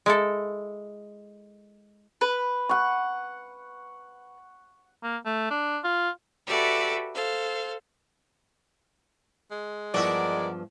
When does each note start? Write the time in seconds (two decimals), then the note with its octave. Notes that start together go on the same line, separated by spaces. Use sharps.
0.06 G#3 E4 A4
2.21 B4
2.69 F#5 C#6
5.03 A#3
5.25 A3
5.50 D4
5.84 F4
6.47 F#4 G4 A4 B4 D5 E5
7.14 A4 C5 F5
9.51 G#3
9.94 E2 G2 F3 F#4 A#4 D5 E5